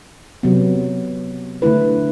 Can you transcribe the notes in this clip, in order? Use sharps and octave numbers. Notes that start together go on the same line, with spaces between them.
C3 F#3 B3
D3 A3 E4 B4